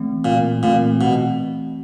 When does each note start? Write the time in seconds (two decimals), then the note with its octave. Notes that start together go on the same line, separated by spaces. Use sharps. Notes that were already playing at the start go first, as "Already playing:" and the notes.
Already playing: E3 A3 C4
0.25 A#2
0.63 A#2 E3 A3 C4
1.01 B2